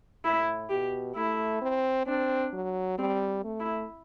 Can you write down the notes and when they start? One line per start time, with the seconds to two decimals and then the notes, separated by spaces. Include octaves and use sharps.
0.25 A2 E4
0.70 B2 G4
1.16 A3 E4
1.61 C4
2.07 C4 D4
2.53 F#3
2.98 G3 C4
3.44 A3
3.60 E4